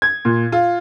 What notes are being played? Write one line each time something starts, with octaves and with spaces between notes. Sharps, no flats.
G#6
A#2
F4